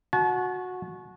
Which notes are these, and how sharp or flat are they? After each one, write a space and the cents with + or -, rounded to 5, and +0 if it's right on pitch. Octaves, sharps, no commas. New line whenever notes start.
F#4 -15 A5 -40